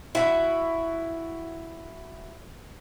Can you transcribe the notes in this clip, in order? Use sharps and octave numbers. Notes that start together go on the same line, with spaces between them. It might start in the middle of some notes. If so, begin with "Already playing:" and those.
E4 F#4